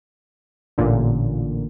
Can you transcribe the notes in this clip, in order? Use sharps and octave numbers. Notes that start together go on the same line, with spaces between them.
A1 A#2 D3